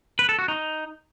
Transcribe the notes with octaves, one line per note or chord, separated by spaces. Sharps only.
B4
A4
F#4
D#4